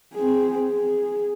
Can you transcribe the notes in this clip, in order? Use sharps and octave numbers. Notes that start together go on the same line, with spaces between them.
C4 G#4
G#4